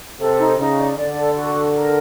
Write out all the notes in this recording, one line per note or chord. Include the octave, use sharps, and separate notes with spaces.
C3 A4
D#4
C#3 D#4
D5
D3 D5
A4
F#4
A4
A#4